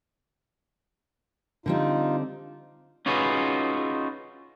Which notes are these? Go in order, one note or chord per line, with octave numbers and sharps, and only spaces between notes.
D3 G3 C4 D#4 F4
C#4 D#4 F4 F#4 G#4 B4